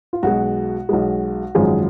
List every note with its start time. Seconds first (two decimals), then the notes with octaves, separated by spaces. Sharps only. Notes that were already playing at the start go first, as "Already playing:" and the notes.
0.13 F4
0.23 B1 B2 G#3 F#4
0.89 B1 B2 G#3
1.55 G#1 F#2 F3 G#3 G#4